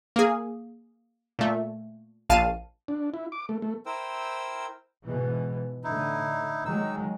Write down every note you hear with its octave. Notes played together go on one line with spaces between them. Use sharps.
A#3 G#4
A#2 A3
A#1 F5 A5 D#7
D4
E4
D6
A3
A3
E4 A#4 C5 G5 E6
G#2 B2 E3
A2 D3 D#4 E4
D#3 F#3 G#3 D#4 E6